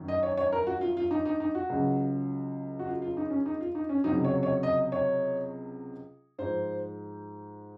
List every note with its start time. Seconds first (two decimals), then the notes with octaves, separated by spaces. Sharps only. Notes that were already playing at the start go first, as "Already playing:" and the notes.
Already playing: F#2 D#3 F#3
0.08 D#5
0.23 C#5
0.37 C#5
0.52 A#4
0.67 F#4
0.81 F4
0.97 F4
1.11 D#4
1.25 D#4
1.40 D#4
1.55 F#4
1.69 C#2 C#3 F#3
2.79 F#4
2.87 F4
3.02 F4
3.17 D#4
3.30 C#4
3.46 D#4
3.61 F4
3.75 D#4
3.89 C#4
4.04 C#2 C3 F#3 D#4
4.24 C#5
4.43 C#5
4.63 D#5
4.92 C#5
6.39 G#2 F3 C5